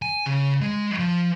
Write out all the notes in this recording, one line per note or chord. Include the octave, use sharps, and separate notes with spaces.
G#5
C#3
G#3
F3